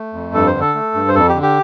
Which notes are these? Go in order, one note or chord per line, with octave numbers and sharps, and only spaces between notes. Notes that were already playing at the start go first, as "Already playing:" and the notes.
Already playing: A3
F2
G2 A4
C5
D3
A4
A3
G2
C5
F2 A4
G4
D3
G4